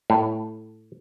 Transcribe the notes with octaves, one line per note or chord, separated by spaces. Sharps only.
A2